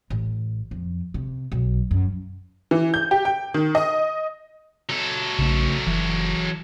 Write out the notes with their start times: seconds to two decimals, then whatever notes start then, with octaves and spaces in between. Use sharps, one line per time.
0.10 A1
0.71 F2
1.14 C3
1.52 B1
1.91 F#2
2.71 E3
2.94 G6
3.11 G4
3.25 G5
3.54 D#3
3.75 D#5
4.89 F#3 A4
5.39 A#1 C#3 A3
5.87 F#1 E3